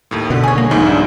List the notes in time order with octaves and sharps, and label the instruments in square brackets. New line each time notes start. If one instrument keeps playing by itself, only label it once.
[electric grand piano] D#2 A2
[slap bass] B2 [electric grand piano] D3
[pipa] G#4 C#5
[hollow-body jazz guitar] A#3
[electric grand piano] C2 F2 G#2 [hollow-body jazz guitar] D#3
[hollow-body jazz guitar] D4